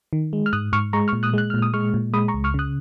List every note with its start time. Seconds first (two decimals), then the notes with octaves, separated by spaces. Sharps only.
0.13 D#3
0.33 G#3
0.46 F6
0.53 G#2 D#6 F#6
0.73 G#2 C#6 F6
0.93 G#3 A#5 C#6
1.08 C#6 F6
1.13 A#2
1.23 D#6 F#6
1.34 G#3 F#6
1.50 A#2 F6
1.62 D#6
1.74 G#3 C#6 F6
1.94 A#2
2.14 G#3 B5 D#6
2.28 A#5 C#6
2.34 C#2
2.44 C#6 F6
2.54 C#3 D#6 F#6